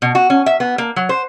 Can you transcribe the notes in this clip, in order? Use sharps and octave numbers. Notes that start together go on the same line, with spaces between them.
B2
F#4
C#4
E5
B3
A#3
F#3
C5